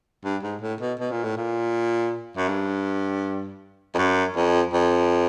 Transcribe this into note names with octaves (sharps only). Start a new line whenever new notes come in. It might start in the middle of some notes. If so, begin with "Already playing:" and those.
G2
G#2
A2
B2
B2
A#2
A2
A#2
F#2
G2
F2
F#2
F2
F2